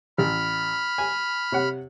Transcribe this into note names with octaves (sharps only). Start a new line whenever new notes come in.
A1 B5 F6
G#5
C3 C#5 F#5